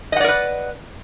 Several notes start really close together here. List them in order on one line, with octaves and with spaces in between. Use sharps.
D#5 F#5 D5 A#4 B4